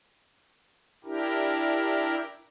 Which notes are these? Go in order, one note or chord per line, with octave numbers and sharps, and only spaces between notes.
D4 E4 G4 A#4